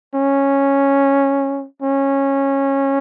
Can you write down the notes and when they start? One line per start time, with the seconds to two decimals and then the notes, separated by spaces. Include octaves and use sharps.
0.14 C#4
1.82 C#4